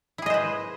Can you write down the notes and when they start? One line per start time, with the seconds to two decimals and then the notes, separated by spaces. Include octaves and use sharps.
0.18 E4
0.22 G#4
0.26 D#5
0.30 C5
0.34 B4